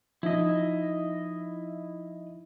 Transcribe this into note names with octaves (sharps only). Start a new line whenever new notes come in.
F3 D#4 E4 D#5